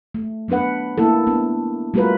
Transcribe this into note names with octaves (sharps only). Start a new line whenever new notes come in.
A3
F#3 B3 D4 B4 F#5
A3 A#3 E4 A4
B3 D4
G3 A3 F4 F#4 A#4 B4